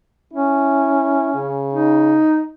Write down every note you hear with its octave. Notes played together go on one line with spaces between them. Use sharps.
C#4 E4
C#3
D#4